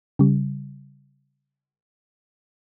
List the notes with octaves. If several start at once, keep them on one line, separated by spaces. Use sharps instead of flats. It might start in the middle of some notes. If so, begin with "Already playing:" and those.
C#3 G3